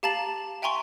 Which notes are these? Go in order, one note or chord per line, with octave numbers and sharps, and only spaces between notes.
G4 F5 A5 A#5 A6 F#7
E5 G5 G#5 A#5 C6 C#6